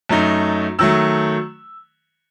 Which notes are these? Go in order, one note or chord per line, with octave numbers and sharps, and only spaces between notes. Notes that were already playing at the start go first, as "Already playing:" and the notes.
F#2 F#3 A3 D#4
D#3 F#3 A3 E6